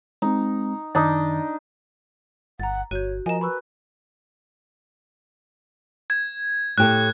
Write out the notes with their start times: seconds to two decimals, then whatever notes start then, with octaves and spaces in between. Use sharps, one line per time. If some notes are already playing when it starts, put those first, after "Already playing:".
0.22 G#3 C4 D#4
0.95 F#2 D#3 D4 D#4 D#5 A6
2.60 G1 F#5 A#5 A6
2.91 G1 F#4 C#5 G6 D#7
3.26 F3 A#4 D#5 G#5 A#5 E7
3.41 B4 B5 C#6 E6
6.10 G#6
6.78 A2 G4 A4 F#6